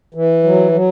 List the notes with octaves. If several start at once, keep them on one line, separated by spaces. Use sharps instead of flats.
E3
F#3
F#3